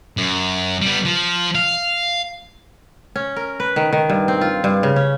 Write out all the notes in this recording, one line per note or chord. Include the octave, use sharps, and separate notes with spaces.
F#2
G3 B3
F3
F5
C#4
A#4
B4
D#3
D#3
G2
C4
F4
G2
C#3
C#4